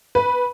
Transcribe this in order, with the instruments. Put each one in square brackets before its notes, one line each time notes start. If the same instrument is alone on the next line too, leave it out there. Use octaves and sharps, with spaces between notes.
[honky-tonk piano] B4